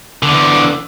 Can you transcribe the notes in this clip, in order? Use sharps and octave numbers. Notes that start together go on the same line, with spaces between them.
E2 D3